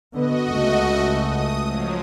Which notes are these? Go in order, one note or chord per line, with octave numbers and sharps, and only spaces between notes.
D3 B3 F#4 D#5
C#2 A3
D#6
F3 F#3